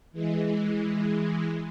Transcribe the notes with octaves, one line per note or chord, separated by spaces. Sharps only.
E3 G#3